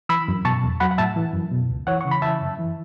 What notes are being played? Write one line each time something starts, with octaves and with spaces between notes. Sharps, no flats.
E3 B5 E6
F#2
B2 A5 C#6
E2
F#3 F#5 B5
F#5
A2 E5 A5
E3
F#2
B2
C#2
E3 C#5 F#5
C#3 C#6
B5
E3 E5 A5
F#2
E3